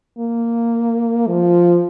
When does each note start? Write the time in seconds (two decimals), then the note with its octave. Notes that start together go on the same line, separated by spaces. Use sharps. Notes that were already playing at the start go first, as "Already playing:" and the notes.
0.19 A#3
1.27 F3